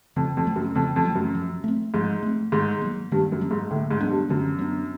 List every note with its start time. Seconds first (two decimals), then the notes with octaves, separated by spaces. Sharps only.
0.16 F2 C#3
0.37 F2
0.47 F#3 A3
0.56 F#2
0.75 F2 C#3
0.96 F2
1.05 F#3 A3
1.15 F#2
1.35 F3
1.64 A3 C4
1.94 G#2 F3
2.23 A3 C4
2.52 G#2 D#3
2.82 F#3 A#3
3.12 G2 D#3
3.32 F#2
3.41 F#3 A#3
3.51 G#2
3.70 A2 D3
3.90 G#2
4.01 F#3 B3 D4
4.09 G2
4.29 F#2 D3
4.59 F#3 B3 D4